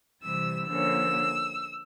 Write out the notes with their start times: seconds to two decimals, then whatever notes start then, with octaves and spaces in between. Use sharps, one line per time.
0.21 C3 E3 G3 E6
0.68 D3 F3 A#3 C#4 E6